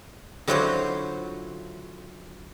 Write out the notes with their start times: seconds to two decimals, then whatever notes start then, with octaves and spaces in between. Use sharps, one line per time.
0.48 D3 F#3 E4 F4 C5 C#5